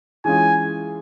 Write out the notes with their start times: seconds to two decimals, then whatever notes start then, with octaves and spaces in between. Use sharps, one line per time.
0.25 E3 G#3 C#4 F4 G#4 G#5